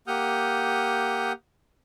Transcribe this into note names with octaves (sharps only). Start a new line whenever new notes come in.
A#3 G4 F#5 D#6 F6 G6